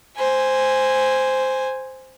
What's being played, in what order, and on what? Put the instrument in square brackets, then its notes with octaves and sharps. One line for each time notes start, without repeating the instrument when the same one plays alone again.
[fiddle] C5 G#5